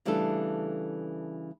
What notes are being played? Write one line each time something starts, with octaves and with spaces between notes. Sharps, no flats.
C#3 E3 G3 A3 D4 A4